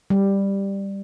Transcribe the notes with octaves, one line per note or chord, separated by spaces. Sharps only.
G3